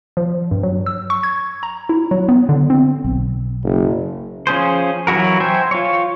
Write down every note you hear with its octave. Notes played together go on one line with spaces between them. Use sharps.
F3
G2
F#3
E6
C#6
G#6
A#5
E4
F#3
B3
D3
C4
B1
F#1
F3 C#4 G#4 C5
E3 F#3 E4 F#4 A#4
C5 E5 G5 G#5
F4 C#5